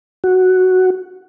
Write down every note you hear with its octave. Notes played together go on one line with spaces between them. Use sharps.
F#4